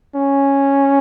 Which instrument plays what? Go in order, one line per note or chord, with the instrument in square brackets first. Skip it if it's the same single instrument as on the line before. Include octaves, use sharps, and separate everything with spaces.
[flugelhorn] C#4